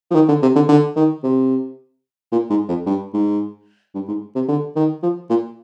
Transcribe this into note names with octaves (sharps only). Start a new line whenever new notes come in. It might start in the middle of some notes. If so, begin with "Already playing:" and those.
F3
D#3
D3
C3
D3
D3
D#3
C3
A#2
G#2
F2
G2
G#2
G2
G#2
C3
D3
D#3
F3
A#2